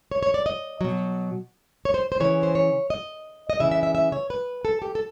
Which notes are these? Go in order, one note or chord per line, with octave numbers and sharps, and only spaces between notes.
C#5
C#5
D5
D#5
B2 F#3
C#5
C5
C5
C#3 E3 C#5
C5
C#5
D#5
D#5
C#3 E3 E5
E5
E5
E5
C#5
B4
A4
G4
A4